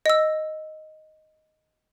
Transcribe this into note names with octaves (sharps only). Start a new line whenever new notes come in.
D#5 E6